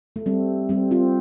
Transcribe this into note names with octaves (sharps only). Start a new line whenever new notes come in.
A3
G3 C4
G3 C4
C4 F4